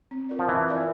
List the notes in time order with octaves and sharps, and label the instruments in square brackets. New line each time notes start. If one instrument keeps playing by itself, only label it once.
[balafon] C4
F4 A#4 D5
[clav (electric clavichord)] F3
[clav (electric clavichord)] E3 [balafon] C4
[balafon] F4 A#4 D5